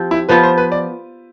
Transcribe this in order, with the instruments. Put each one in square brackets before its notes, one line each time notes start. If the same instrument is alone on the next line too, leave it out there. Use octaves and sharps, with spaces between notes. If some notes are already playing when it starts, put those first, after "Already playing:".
Already playing: [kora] F3 C4 G4
[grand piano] E4
[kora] F3 B3 F4 [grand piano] B4
[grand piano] C5
B4
D5